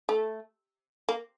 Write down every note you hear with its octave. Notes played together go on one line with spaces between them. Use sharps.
A3
A#3